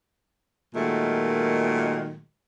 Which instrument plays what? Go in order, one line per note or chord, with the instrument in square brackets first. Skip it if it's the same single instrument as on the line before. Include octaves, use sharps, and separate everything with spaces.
[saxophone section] A#2 D#3 F#3 G#3 A3